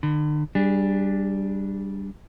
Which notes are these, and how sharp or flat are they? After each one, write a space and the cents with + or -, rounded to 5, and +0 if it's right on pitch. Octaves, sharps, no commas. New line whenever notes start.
D3 +45 B5 +30
G3 +0 D4 +0 G#4 -30